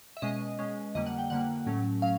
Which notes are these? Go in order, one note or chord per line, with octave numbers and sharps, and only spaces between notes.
E5
B2 G#3 C#4 D#5
B2 G#3 C#4
F2 D3 G3 A#3 D#5
F#5
G5
F2 D3 G3 A#3 F#5
A2 F#3 A3 C#4
F#3 C#4 F5